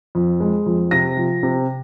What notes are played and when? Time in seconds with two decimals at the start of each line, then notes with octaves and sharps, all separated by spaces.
0.15 F2
0.40 G#3
0.66 F2
0.91 C3 A#6
1.17 F3
1.43 C3